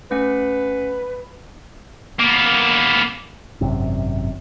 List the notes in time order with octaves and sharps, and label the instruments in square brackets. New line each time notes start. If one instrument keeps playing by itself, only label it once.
[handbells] A3 C#4 F#5 [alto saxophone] B4
[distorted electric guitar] A#3 B3
[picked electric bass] G#1 F#2 C3